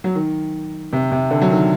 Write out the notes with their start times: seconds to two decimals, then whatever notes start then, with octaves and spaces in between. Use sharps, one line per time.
0.04 F#3
0.15 D#3
0.93 C3
1.12 C3
1.31 D3
1.42 F#3
1.50 D#3